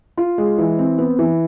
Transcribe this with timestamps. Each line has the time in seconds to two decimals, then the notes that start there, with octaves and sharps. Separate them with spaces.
0.17 F4
0.38 G#3
0.58 E3
0.79 C4
0.98 B3
1.19 E3